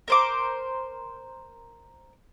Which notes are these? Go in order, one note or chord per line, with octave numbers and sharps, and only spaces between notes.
A#4 C5 D6